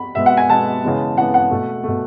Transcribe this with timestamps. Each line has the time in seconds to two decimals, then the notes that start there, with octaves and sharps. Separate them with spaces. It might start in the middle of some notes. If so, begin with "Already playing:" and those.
Already playing: B5
0.15 B2 G#3 B3 E5
0.26 F#5
0.37 G#5
0.49 B2 G#3 B3 A5
0.84 C#3 E3 G#3 B3
1.17 C#3 E3 G#3 B3 F#5
1.34 F#5
1.51 B2 A3
1.84 B2 A3